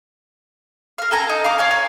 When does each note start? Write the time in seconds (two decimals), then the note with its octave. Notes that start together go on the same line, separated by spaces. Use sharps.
0.98 A#4 F5
1.11 A4 A#4 G#5 A#5
1.29 D#4
1.44 F5 A#5 D6
1.58 C#5 F5 G#5
1.71 C#5 G#5